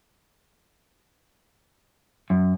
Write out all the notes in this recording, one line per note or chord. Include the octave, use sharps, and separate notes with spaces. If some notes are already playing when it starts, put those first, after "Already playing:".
F#2